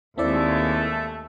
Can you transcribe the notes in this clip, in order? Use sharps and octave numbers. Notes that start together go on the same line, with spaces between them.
D#2 G#3 A3 C4 E4 A4 D5 E5